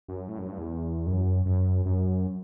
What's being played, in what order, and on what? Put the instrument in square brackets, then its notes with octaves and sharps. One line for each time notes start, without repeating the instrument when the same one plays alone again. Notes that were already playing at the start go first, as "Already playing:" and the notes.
[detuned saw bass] F#2
A2
F#2
G2
E2
F#2
F#2
F#2